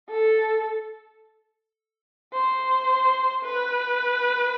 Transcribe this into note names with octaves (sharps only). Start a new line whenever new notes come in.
A4
C5
B4